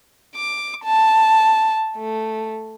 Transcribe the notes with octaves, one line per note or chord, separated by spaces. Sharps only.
D6
A5
A3